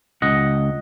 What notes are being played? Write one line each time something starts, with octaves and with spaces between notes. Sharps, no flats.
C#2 D#5 F#5